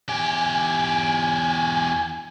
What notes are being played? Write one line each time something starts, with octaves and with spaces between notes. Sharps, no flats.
E2 G4 G#5